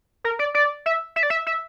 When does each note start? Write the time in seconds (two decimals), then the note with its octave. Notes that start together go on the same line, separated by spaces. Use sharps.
0.24 A#4
0.39 D5
0.54 D5
0.86 E5
1.16 E5
1.23 D5
1.30 E5
1.47 E5